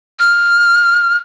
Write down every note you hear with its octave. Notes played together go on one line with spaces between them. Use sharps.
F6